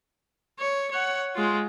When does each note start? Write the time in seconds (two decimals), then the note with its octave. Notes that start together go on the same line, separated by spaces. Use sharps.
0.59 C#5
0.91 C#5 F#5
1.36 G#3 F4